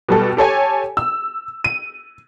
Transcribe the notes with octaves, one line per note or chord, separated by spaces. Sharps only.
B2 G3 A4
G4 A4 C#5 G#5
E6
D#7